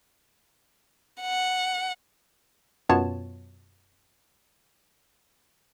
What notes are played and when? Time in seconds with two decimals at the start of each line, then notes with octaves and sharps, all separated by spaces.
1.22 F#5
2.89 F#2 B2 B3 F4 C#5 A5